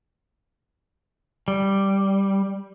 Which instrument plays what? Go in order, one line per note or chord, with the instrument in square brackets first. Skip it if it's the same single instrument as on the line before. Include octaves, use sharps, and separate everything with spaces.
[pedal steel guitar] G3